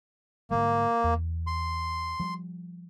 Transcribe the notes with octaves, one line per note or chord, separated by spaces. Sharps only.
G#2 D3 G3 A#3
E2
C6
F3 G3